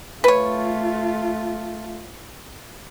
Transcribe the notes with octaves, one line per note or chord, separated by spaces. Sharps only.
A3 F4 B4 C#5